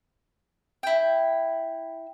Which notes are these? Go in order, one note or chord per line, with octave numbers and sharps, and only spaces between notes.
E4 G5